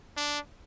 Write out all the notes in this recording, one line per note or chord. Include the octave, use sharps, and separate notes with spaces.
D4